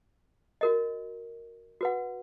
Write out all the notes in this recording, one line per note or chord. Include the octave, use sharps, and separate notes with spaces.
F#4 A#4 D#5
F#4 B4 F#5